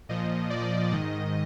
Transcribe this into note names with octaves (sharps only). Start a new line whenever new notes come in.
A#2 F3 D#5
D5
G#2 D#3 D#5